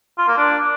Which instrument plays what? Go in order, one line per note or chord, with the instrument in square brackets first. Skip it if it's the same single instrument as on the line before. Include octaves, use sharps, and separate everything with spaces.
[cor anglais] F4
A#3
D4